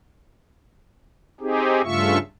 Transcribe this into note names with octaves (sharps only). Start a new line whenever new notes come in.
C4 D#4 G4 G#4
G2 C#3 A3 F4 E5 C#6